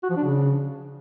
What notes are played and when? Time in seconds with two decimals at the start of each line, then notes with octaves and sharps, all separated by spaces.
0.03 F#4
0.10 F3
0.17 D4
0.24 C#3